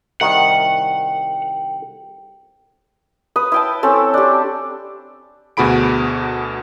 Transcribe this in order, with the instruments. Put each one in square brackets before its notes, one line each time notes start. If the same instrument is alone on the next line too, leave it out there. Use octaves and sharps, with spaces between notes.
[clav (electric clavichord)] C2 D#3 [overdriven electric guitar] F#5 [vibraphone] G5
[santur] B4 D#6
E4 G5 A5
C4 C#4 A4
D4 G4
[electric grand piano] D2 B2 F#4 G#4 B5 D7